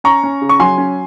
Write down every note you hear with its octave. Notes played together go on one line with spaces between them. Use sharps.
C#4 A#5 C#6
C#4
C#3
C#6
F#3 G#5 C6
C#4